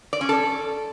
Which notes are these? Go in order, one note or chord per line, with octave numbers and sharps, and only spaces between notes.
D5
C#4
A4